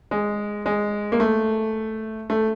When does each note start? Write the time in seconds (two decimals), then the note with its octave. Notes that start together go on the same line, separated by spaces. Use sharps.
0.11 G#3
0.66 G#3
1.12 A#3
1.20 A3
2.30 A3